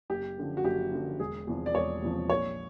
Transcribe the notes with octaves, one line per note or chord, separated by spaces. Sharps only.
F#1 G4
F#2 D3 F3
F#4
F#1 G4
F#2 D3 F3
E1 G#4
E2 C3 F3
D5
E1 C#5
E2 C3 F3
A#1 C#5